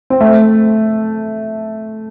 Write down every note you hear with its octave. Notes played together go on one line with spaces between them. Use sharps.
C4
A3